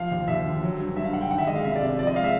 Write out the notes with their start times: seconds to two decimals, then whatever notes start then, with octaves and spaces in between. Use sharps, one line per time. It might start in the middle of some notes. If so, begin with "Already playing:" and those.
Already playing: F3 F5
0.11 D#2
0.28 D#2 E5
0.45 D3
0.63 F#3
0.79 G2
0.96 G2 E5
1.05 F5
1.13 D3 F#5
1.21 G5
1.31 D#3 F#5
1.38 E5
1.47 G#3 D#5
1.56 F5
1.65 C2 E5
1.76 D5
1.81 C3
1.99 F3 D5
2.07 D#5
2.16 G#3 F5
2.24 E5